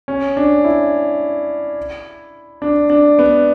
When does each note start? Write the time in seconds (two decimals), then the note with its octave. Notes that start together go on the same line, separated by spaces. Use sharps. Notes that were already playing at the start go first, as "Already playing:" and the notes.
0.08 C#4
0.37 D4
0.64 E4
2.62 D4
2.90 D4
3.19 B3